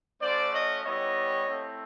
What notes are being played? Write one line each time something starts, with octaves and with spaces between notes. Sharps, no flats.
A3 C#4 F#4 C5 D5
C#5 D#5
G3 B3 E4 G4 C#5 D#5
A3 C4 E4